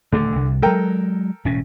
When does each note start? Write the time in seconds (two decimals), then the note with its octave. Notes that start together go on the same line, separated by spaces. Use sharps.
0.12 D#1 D3 A3 D4
0.36 C2
0.62 F#3 G#3 A4 A#4 G5
1.45 E1 A2 C#4